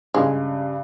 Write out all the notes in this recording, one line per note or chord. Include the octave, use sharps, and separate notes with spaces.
G2 C#3 G#3